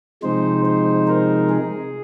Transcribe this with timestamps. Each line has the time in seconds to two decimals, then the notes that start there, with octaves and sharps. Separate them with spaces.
0.23 C3 F3 G#3 D#4 C5
0.66 C5
1.07 A#4
1.50 G#4